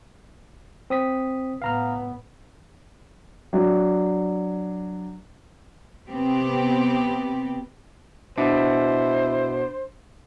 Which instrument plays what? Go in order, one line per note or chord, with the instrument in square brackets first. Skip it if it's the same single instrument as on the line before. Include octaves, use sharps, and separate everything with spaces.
[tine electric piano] C4 D#6 B6
[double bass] A2 B3 [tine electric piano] F5 A#5 F6
[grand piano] F#3 D4
[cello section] C3 B3 C4 G4
[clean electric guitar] B2 [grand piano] D4 [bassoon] E4 [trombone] C5